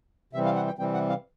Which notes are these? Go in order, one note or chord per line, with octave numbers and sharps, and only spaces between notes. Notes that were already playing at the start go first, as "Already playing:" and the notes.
C3 E3 G3 C4 E5
F5
F#5
G5
C3 E3 G3 C4 G5
F#5
F5